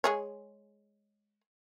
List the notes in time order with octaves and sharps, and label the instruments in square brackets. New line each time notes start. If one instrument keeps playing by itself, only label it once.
[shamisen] G#3 G#4 C#5